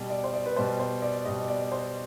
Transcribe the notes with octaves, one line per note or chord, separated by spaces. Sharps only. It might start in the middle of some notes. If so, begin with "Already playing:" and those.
Already playing: B2 G3
D5
C5
D5
B4
B2 G3 C5
C5
D5
B2 G3 D#5
D5
C5